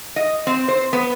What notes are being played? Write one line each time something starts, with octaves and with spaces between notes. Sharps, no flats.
D#5
C4
C5
B3